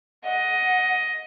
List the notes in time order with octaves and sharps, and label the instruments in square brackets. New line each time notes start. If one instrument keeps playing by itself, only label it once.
[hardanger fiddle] D#5 [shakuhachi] F#5